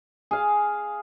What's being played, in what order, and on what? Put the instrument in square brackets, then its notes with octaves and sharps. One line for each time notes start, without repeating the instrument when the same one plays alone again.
[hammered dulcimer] G#4 F5